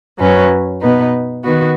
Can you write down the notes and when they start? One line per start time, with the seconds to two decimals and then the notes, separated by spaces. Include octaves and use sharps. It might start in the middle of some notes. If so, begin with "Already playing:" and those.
0.19 F#2 F#3 C#4 B4
0.81 B2 B3 D#4 B4
1.43 D#3 B3 F#4 B4